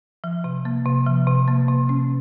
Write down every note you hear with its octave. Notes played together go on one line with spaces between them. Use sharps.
F3
C3
A#3
C3
F3
C3
A#3
C3
C#4